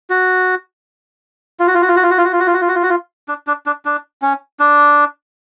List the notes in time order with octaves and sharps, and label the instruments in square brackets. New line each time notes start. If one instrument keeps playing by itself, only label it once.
[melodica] F#4
F4
F#4
F4
F#4
F4
F#4
F4
F#4
F4
F#4
F4
F#4
F4
F#4
F4
F#4
F4
F#4
F4
D4
D4
D4
D4
C#4
D4